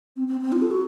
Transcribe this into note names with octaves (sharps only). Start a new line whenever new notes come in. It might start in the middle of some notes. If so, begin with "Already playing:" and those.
C4
C4
C4
F4
A4
F#4